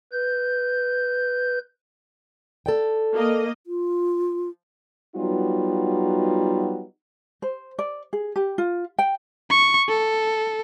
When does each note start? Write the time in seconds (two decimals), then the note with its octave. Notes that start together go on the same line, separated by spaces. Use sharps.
0.12 B4 G6
2.66 A4 D5 G5
3.14 A#3 D#5
3.67 F4
5.16 F#3 G3 B3 D#4 F4 F#4
7.42 C5
7.79 D5
8.13 G#4
8.36 G4
8.58 F4
8.99 G5
9.50 C#6
9.89 A4